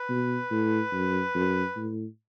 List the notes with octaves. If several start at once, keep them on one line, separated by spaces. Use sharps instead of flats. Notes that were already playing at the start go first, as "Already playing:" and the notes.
Already playing: B4
B2
A2
F#2
F#2
A2